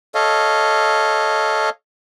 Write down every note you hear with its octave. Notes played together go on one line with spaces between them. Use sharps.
A4 C#5 D#5 F5